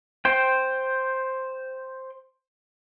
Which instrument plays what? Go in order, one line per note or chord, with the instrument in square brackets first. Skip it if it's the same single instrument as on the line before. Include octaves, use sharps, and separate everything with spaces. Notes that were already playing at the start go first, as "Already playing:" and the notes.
[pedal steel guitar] C5 G5